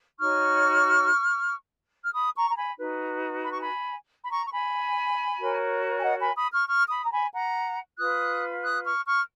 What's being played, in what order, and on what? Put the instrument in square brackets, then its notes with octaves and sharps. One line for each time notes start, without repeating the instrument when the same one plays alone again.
[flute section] D#4 F#4 C#5 C#6 F6
F6
B5 D#6
A#5 C#6
A#5
G#5 B5
D#4 F#4 B4
B5
C#6
G#5 B5
B5
A#5 C#6
C#6
G#5 B5
F#4 A#4 C#5
G#5
D#5 F#5
G#5 B5
B5 D#6
C#6 F6
C#6 F6
B5 D#6
A#5
G#5 B5
F#5 A#5
F4 B4 D#6 F#6
D#6 F#6
C#6 F6
C#6 F6